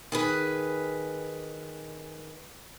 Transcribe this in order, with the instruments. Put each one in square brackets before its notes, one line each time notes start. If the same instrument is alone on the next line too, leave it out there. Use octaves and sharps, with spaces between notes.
[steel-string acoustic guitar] D#3 G#4 B4